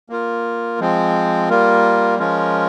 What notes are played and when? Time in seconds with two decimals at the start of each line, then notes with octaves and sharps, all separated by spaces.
0.09 A#3 F4 A#4
0.80 F3 G#3 C4
1.50 G3 A#3 F4 A#4
2.19 F3 G#3 C#4 F4 A#4